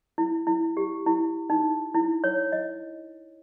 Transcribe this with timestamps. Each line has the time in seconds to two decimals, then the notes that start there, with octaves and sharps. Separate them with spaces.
0.18 E4
0.47 E4
0.77 G4
1.06 E4
1.50 D#4
1.94 E4
2.24 C#5
2.52 D#5